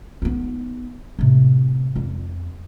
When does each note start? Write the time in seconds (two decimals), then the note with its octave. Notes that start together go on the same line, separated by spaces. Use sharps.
0.22 B3 D#4
1.19 A2 C3
1.95 F2 D4